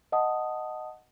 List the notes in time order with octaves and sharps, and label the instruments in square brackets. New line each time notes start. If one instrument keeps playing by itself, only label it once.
[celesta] D#5 F#5 A5 D#6